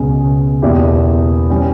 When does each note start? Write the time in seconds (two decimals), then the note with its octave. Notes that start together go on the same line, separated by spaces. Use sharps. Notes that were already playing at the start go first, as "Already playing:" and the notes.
Already playing: C#2 B2 G#3 C#4
0.62 E2 B2 A#3 E4 G4
1.50 E3 G3 C#4